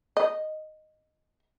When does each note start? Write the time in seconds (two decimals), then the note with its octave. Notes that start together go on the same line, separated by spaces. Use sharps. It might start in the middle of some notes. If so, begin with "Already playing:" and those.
0.17 D#5